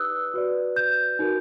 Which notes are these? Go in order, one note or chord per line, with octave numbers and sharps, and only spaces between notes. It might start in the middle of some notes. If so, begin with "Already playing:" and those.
Already playing: D#4 G4 B4 D5 D#6 E6 F#6
F#4 B4 D5
G6
D#4 F#4 A#4